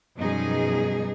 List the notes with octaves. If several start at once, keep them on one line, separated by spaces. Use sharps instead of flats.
F#2 B2 F3 G3 D#4 G#4